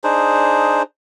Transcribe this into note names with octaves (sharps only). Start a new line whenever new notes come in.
D4 D#4 G#4 C5